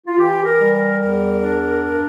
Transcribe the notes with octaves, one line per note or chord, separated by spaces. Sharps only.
F4
E3 G4
A#4
G3
A#4
E2 A#4
D4
G2